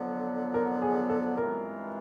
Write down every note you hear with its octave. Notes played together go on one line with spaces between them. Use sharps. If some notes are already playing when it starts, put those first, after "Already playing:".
Already playing: F2 D3 F#3 B3
A#4
G#4
A4
G2 E3 G#3 C4 F4 A#4